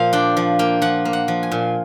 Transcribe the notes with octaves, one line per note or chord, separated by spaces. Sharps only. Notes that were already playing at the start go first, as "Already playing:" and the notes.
Already playing: A#2 F3 A#3 C5 F5
D4 G5
F3
A#3 G5
F3 F#5
A#3
F#5
F3
G#5
A#2